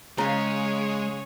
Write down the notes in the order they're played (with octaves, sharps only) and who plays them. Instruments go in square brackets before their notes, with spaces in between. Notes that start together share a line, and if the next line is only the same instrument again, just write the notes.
[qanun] C#3 F5 [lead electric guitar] G#3 [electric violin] G#4 C#5 [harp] A#5